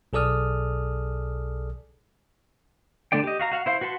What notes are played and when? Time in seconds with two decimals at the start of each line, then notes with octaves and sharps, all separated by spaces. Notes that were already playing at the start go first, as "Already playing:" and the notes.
0.13 B1 G#4 A4 D5 D#6 F6
3.12 D3 A3 D4 D5 G5
3.24 G4 D#5
3.39 F#4 F5 A#5
3.52 F#4 F5 F#5
3.66 E4 C5 F5
3.81 F#4 B4 F#5 A5 C6